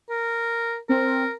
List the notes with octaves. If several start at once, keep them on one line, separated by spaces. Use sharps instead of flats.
A#4
C4 A#4